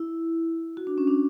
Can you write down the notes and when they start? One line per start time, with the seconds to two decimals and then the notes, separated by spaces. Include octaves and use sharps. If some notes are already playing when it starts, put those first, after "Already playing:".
Already playing: E4
0.77 F#4
0.87 D4
0.98 C#4
1.07 D4